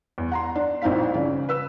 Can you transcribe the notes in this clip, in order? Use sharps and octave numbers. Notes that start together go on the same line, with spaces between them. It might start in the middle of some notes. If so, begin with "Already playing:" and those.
E2
F#5 A#5 C6
D4
A#1 C4 D#4 E4 F5 B6
C#3 D5
B4 E6